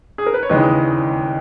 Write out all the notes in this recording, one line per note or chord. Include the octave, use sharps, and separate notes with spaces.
G#4
A#4
B4
C#5
E1 D#2 C#3 E3 G#3 B4 D#5